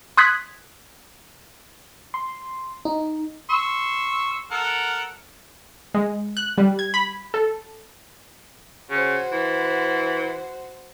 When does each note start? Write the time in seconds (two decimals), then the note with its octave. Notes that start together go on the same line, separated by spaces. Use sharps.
0.17 C6 D#6 F#6 G#6 B6
2.14 C6
2.85 D#4
3.50 C6 C#6 E6
4.51 A4 A#4 F#5
5.94 G#3
6.37 F#6
6.58 G3
6.79 G#6
6.94 B5
7.34 A4
8.90 C#3 F#4 C5
9.32 E3